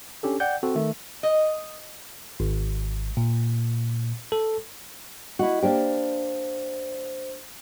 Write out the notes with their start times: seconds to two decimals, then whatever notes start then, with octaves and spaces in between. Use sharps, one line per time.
0.23 C#4 D4 G4 A4
0.40 D5 F#5 G5 G6
0.63 C4 F#4 A4
0.75 D#3 A3
1.23 D#5
2.40 G#1
3.17 A#2
4.32 A4
5.39 E4 F#4 D#5
5.62 A#3 D4 G4 C5